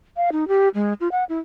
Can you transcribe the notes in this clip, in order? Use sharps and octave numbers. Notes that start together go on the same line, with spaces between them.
F5
D#4
G4
G#3
F4
F#5
E4